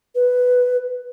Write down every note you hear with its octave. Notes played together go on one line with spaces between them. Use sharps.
B4